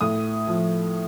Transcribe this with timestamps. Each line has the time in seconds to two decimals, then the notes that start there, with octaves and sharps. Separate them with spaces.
0.01 A2 D#6
0.47 F3